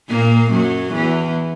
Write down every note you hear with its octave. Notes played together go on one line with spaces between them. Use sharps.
A#2 A#3
F#2 F#3
E2 E3